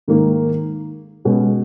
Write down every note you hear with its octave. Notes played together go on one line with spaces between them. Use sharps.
G#2 D#3 A#3 D#4
B2 G#3 C#4